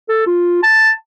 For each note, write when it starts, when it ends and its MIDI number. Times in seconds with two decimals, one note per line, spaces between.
0.09 0.23 69
0.27 0.58 65
0.63 0.91 81